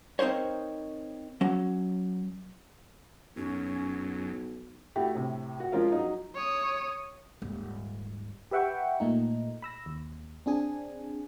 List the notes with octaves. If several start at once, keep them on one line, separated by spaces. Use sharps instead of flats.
C4 D#4 A#4 C5 C#5
F#3 C#4
B1 F#2 C#4
A3 E4 F#4 G4
A2 C3
F#4
F3 G#3 C#4 F4 A#4 F5
F#3 D#4
C#5 D#6
D#1 G#2
G4 B4 E5 F#5 G5 C#6
A#2 A3 D#4
B5 E6 A#6
D#2
C4 D4 G#4 G#5